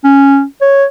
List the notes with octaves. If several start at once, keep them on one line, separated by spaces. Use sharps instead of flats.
C#4
C#5